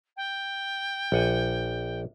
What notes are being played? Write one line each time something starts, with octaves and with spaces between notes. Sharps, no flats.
G5
A#1 F#5 G#5